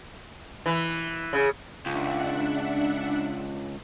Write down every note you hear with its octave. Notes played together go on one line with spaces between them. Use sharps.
E3
C#3
C#2 D4 E5 F#5